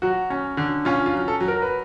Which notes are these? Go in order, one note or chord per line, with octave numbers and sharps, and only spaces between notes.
F#3 F#4
C#4
D3
C#4 F4
F4
F#3
A4
F#3
A#4
B4